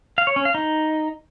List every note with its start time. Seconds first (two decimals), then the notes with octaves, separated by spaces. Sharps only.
0.18 F5
0.27 C#5
0.36 C#4
0.45 F5
0.55 D#4